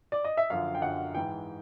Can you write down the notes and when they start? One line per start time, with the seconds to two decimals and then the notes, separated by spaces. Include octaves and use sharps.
0.12 D5
0.24 D#5
0.37 E5
0.50 F#2 D3 F3 F5
0.75 G5
0.82 F#2 D3 F3 F#5
1.15 G#2 E3 G5